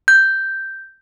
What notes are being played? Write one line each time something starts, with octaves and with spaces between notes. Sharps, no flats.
G6